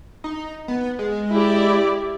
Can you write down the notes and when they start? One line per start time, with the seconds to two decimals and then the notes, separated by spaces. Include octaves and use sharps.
0.24 D#4
0.68 B3
0.99 G#3
1.31 E4 G4 D5